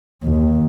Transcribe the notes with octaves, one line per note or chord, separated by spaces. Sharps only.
D#2